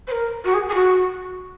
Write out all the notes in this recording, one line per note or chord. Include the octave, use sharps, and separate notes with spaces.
C5
A#4
F#4
G#4
G#4
F#4